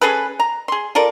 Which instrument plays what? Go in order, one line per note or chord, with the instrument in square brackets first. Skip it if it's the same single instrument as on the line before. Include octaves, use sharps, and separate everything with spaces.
[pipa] C#4 G#4 A4 B4
A#5
G#4 C6
F4 A4 A#4 D5